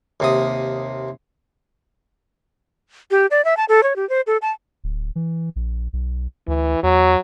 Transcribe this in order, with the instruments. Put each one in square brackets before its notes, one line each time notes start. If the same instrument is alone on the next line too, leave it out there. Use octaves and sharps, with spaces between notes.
[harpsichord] D#2 C3 D#6
[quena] G4
D5
E5
A5
A4
C#5
G4
C5
A4
A5
[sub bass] D1
E3
A#1
B1
[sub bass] D2 [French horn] E3
[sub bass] E2 [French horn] F#3